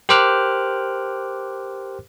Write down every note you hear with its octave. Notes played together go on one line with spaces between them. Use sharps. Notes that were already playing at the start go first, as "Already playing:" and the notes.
G4 A#4 C5 D6 F6 F#6